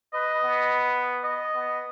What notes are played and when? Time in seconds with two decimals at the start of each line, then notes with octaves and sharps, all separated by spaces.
0.13 B4 D#5
0.43 B3
1.23 D#5
1.53 B3